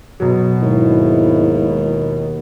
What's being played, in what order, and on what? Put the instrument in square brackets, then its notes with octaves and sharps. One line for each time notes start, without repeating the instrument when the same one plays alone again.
[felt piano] B2 F#3
[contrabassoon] D#2 [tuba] G#2 [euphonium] E4